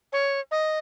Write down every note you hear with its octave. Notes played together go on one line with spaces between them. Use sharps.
C#5
D#5